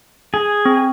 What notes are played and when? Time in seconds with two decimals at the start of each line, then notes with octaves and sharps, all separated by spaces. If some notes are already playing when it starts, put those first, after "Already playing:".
0.34 G#4
0.65 C4